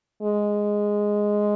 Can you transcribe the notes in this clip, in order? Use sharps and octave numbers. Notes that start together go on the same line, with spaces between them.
G#3